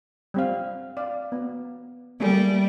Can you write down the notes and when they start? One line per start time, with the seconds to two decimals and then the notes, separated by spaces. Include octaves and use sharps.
0.34 G3 C4 F5
0.97 D5 F5
1.32 B3
2.20 G3 A3 A#3 G#4